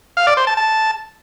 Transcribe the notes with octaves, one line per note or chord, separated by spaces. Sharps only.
F5
D5
C5
A5
A5